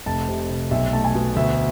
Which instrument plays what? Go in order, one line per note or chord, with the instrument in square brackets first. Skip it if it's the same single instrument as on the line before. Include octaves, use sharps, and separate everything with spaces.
[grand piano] F1 A5
C3
C3
B1 E5
A3 A5
G#5
B2
D2 E5